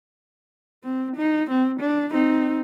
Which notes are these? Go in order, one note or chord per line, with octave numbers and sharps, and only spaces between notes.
C4
D#4
C4
D4
C4 D#4